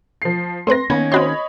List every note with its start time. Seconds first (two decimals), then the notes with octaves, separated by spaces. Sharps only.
0.22 F3 C7
0.67 A3 C4 B4 C6 A#6
0.90 D#3 A#3 B3 C#4 G#6
1.12 C4 F#4 C#5 D#5 B5 C6